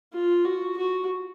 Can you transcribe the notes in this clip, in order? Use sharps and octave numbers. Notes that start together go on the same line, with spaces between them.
F4
F#4
F#4